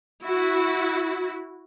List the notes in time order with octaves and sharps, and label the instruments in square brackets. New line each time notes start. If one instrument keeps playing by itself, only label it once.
[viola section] E4 F#4